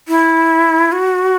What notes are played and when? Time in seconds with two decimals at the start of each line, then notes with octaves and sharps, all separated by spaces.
0.08 E4
0.92 F#4